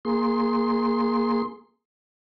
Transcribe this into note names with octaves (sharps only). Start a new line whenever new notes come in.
A#3 G#4 C6